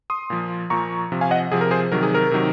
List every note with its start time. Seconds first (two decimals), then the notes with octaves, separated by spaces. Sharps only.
0.10 C6 D#6
0.30 A#2 F3
0.70 A#2 F3 A#5 C#6
1.12 C3 F3
1.21 F5 G#5
1.31 D#5 F#5
1.52 C3 F3 G#4
1.61 A#4
1.71 G#4 C5
1.92 C3 D#3 F#3 A#4
2.03 G#4
2.15 A#4
2.31 C3 D#3 F#3